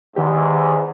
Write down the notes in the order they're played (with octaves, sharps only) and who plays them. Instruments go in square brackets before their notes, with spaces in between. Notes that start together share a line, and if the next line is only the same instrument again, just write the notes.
[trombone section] E2 G#2 [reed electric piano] D#3 G4